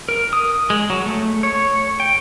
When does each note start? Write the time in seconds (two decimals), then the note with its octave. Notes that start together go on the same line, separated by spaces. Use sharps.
0.09 A#4
0.33 D#6
0.70 G#3
0.90 F#3
1.06 A3
1.43 C#5
2.00 G5